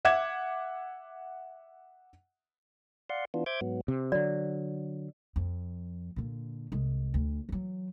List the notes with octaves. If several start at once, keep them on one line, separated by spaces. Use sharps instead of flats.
E5 F#5 D6 G#6 E7
D5 F5 F#5 C6
E3 B3 D4 F4
C5 E5 D6 G6 G#6
G#2 F#3 B3
C3
D3 F#3 D5
F2
A#2 D3
C2 G#3
D2
E3 F#3